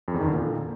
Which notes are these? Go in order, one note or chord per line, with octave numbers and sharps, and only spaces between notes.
F2
E2
D#3
D3
A#2